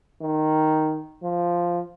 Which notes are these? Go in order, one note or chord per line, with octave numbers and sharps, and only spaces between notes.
D#3
F3